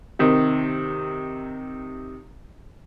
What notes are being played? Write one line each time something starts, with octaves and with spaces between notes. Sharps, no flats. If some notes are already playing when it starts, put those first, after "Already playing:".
C3 D#3